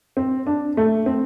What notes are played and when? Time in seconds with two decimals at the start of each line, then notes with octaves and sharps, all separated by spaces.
0.17 C4
0.47 D4
0.77 A3
1.06 C4